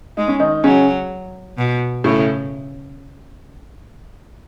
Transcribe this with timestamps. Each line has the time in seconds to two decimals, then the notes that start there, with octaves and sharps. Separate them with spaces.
0.17 G#3 D#4
0.28 C#4
0.40 D#3 D#4
0.64 C#3 F#3 C#4
1.58 B2
2.04 A2 C#3 A3